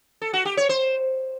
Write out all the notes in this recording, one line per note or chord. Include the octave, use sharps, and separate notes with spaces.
A4
F#4
G4
C#5
C5